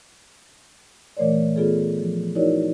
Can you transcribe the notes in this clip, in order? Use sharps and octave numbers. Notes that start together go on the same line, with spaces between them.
A#2 E3 A3 A#4 C#5 D5
B3 F4 G#4 A4
F3
D#4 E4 F#4 A#4 C#5 D5